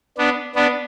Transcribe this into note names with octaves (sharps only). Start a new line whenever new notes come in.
B3 D4
B3 D4